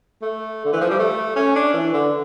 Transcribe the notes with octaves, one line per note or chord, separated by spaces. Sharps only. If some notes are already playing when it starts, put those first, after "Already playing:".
A3
D3
E3
F3
G3
A3
C#4
D4
E3
D3